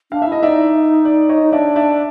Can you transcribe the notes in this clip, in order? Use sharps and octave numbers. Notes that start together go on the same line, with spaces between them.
D4 F5
E5
E4 D#5
D#4 D5 E5
D5
C#5 D#5
D#4
D4 D5 E5
D5 E5